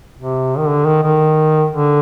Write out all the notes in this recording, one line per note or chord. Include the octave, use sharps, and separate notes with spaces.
C3
D#3
D3
D#3
D#3
D3